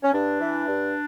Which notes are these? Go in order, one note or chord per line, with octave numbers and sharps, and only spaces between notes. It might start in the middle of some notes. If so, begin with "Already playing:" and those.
C#4
G2 D4
E3
G2